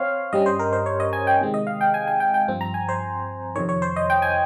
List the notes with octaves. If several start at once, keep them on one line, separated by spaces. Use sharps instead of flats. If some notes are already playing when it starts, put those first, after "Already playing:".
Already playing: C4 C5 C#5 F5
G2 G3 C#4 D#5
C5
A#4
C5
C#5
D#5
G#5
G5
C3 D#3 G#3 C4
D#5
F5
G5
G#5
G#5
G5
G5
G2 F3 C4
A#5
G#5
C5
F2 C3 D#3 C#5
C#5
C5
D#5
G5
G#5